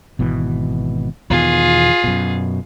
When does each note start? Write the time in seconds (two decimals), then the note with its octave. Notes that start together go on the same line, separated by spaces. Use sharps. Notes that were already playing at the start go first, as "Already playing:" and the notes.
0.19 G#1 B2 E3
1.30 E2 B2 D#3 F4 G#4
2.04 F#2 B2